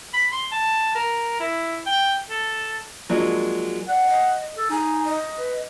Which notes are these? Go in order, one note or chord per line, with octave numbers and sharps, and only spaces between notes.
B5
C6
A5
A#4
E4
G5
A4
F3 F#3 G#3 A#3 D4
D5 F#5
D#5
A4
D#4 G#5
D#5
B4